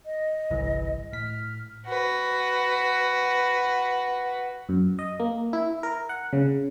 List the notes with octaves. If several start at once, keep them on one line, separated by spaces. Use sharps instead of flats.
D#5
G1 C2 E3
A2 F6 B6
F#4 B4
F#2
D#5
A#3
E4
A#4
F#5
C#3